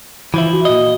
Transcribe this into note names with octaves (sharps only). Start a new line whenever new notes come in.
E3 F3 E4
F#4
A#2 D#5